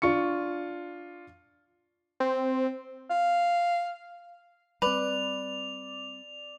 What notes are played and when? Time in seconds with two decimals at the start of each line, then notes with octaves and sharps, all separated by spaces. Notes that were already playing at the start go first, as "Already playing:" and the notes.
0.02 D4 F4 C#6 C#7
2.20 C4
3.10 F5
4.82 G3 C4 B4 D5 F7